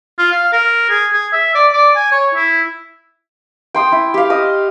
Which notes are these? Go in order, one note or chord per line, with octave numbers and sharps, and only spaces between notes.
F4
F5
A#4
G#4
G#4
E5
D5
D5
G#5
C#5
E4
G5 C6 D#6
E4
G4 F5
D#5 D#6